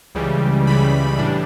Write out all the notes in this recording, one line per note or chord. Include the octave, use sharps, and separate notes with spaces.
C#2 C#3 E3 G3
C#2 C#3 E3 G3 B5
A2 E3 G3 D4